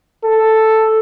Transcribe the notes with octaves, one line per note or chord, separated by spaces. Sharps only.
A4